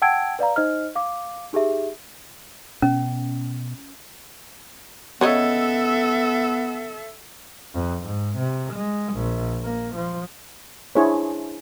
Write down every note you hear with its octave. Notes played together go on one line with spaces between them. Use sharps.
F#5 G5 A5 E6 G#6 D7
B4 D5 F5 A#5
D#4 C5 D#5 F6
F5 D6
D#4 G4 G#4 E5
B2 C#4
C#3 B3 A4 C#5 D#5 E5
F2
G#2
C3
G#3
A#1
A#3
F3
D4 E4 G#4 C5 C#5